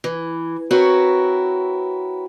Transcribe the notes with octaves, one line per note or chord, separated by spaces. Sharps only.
E3
C4 E4 F#4 A#4 B4 C#5